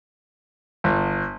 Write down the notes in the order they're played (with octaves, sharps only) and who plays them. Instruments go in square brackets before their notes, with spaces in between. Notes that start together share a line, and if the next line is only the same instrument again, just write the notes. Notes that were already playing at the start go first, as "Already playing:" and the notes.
[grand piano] G1